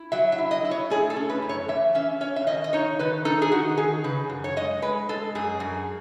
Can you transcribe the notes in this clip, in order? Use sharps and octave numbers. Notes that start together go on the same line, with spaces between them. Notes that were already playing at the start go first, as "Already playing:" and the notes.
Already playing: E4
F#3 E5
E5
E4
D#5
E4
C#5
A3 G#4
A4
C#4
B4
F#2
C#5
E3 E5
C#4 E5
C#4 C#5
E5
D#3 D#5
D#5
D#4 C#5
D#3 B4
D#4 A4
G#4
D#3 F#4
D#3 G#4
C#3 B4
F#2
C#5
G#3 D#5
G#3 B4
G#3 A4
F#2 G#4
F#2